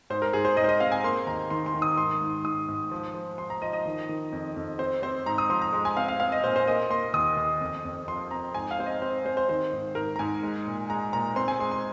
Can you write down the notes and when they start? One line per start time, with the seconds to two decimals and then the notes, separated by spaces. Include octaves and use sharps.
0.10 G#2 C5
0.22 A#4
0.33 G#2 G#4
0.45 C5
0.57 G#2 D#5
0.64 C5
0.69 D#5
0.80 C4 F5
0.92 G#5
1.04 A#3 C6
1.27 D#2 A#5
1.50 D#3 C6
1.66 C6
1.74 D#3
1.82 D#6
1.97 G#2 C6
2.21 G#2
2.44 G#2 D#6
2.68 G#2
2.91 F3
3.14 F3
3.38 F3 C6
3.50 A#5
3.62 F3 D#5
3.73 D#5
3.85 D#3
4.09 D#3
4.32 F2
4.56 F2
4.79 C4 C5
5.02 C4 C5
5.26 G#2 A#5
5.38 D#6
5.49 F3 C6
5.62 A#5
5.73 G#3
5.85 G#5
5.97 C4 F5
6.08 F5
6.20 C4 F5
6.32 D#5
6.44 A#2 C5
6.56 C5
6.67 A#3 D#5
6.90 A#3 C6
7.14 D#2 D#6
7.37 D#2
7.61 F2
7.85 F2
8.08 F3 C6
8.31 F2 A#5
8.55 G#2 G#5
8.71 F5
8.79 C4 C5
8.86 D#5
9.02 C4 C5
9.25 C4 C5
9.37 C5
9.49 D#3 C5
9.73 G#2
9.95 G#2 A#4
10.16 A#5
10.19 G#2 G#5
10.43 G#3
10.67 A#2
10.90 G#3 A#5
11.13 A#2 A#5
11.36 C4 C6
11.48 G#5
11.60 G#3 C6
11.72 C6